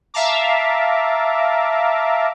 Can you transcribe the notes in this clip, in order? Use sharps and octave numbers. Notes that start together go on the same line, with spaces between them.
E5 F5 A5 A#5 D6